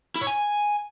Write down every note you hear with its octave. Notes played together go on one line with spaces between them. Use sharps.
E4
C#5
G#5